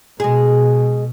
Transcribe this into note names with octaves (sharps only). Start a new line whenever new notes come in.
B2 G#3 G#4